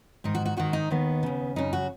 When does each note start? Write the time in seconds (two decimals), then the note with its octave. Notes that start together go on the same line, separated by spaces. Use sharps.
0.24 G#2 D#3 D#4
0.35 F#4
0.46 F#4
0.57 G#2 D#3 F#4
0.73 D#4
0.90 D#2 D#3 B3
1.23 D#2 C#3
1.56 F#2 C#3 D#4
1.73 F#4